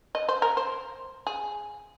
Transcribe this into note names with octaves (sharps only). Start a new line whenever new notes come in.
D#5
C5
A#4
C5
G#4